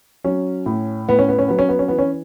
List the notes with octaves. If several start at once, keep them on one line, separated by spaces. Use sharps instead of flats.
F#3 C#4
A2
A2 B3
C#4
B3
C#4
F#3 B3
C#4
B3
C#4
E3 B3
C#4